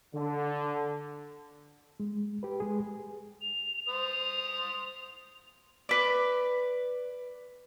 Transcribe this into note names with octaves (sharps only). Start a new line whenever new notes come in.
D3
G#3
G4 B4
G#3 G#4
F7
C5 D#6
B4 D5